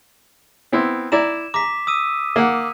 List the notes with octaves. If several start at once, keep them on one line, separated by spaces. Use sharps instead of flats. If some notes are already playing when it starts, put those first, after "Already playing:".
B3 C4 E4
E4 D5 A#5 E7
A#5 D6 B6
D#6 E6 D#7
A#3 F#5